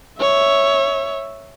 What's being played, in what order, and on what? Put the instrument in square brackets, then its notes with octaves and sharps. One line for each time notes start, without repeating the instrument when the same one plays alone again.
[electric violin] C#5 E5